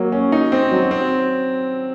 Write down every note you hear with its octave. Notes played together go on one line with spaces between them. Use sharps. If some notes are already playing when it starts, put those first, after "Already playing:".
Already playing: F#3 A#3
C#4
D#4
C4
F#3
C4